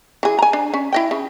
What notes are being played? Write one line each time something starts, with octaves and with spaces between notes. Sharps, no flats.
E3 G#4
G#5 A#5
D4
C#4
E4 D#5 G5
C#3